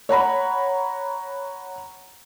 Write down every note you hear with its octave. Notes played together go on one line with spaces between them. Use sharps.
C#5 F#5 A#5 B5